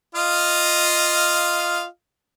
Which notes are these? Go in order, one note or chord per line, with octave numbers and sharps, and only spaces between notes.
F4 D#5 F5